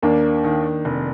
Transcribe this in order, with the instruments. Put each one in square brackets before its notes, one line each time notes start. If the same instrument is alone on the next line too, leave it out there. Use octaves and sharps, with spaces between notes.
[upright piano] D#2 [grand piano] A#3 D4
[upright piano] D#3
F1